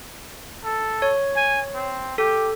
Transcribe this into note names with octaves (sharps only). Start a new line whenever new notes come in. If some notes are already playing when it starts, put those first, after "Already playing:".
A4
C#5
G#5
C4
G4 A4